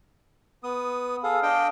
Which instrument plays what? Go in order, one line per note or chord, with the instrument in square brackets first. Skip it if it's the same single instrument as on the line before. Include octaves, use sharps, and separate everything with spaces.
[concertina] B3 D#6
[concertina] G#4 A4 [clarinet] F5
[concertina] D4 D#5 G5